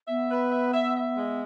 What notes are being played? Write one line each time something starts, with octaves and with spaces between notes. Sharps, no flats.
B3 E5
B4
E5
E5
E5
G#3